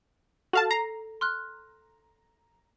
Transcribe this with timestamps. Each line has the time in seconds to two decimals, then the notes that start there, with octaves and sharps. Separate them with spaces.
0.53 F#4 A4 F5 A5
0.71 A#5 C7
1.21 C6 F6 F#6